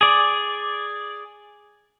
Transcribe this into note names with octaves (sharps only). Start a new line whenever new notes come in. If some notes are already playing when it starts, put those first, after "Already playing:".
G#4 D5